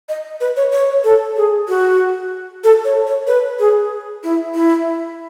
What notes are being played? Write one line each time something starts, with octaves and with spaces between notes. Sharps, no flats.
D#5
B4
C#5
C#5
A4
G#4
F#4
A4
C#5
C#5
B4
G#4
E4
E4